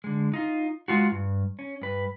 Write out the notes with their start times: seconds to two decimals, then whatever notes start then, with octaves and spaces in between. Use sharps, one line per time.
0.04 D3 G#3
0.34 D#4 F4
0.88 G#3 F4 F#4
1.11 G2
1.59 C#4
1.82 G2 B4